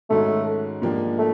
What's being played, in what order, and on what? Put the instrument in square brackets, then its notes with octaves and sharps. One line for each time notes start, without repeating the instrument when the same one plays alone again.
[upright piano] G#2 D#3 G#3 C#4 F#4 [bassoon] A3
[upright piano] G#2 F3 A#3 D4 G4
[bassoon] A3